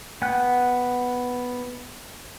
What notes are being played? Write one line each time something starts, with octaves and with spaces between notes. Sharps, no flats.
B3 F#5 G5 F#6